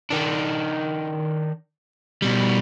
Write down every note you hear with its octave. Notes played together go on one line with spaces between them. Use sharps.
D#3 D4
B2 G3